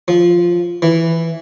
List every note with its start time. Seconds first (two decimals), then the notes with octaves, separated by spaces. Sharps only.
0.08 F3
0.82 E3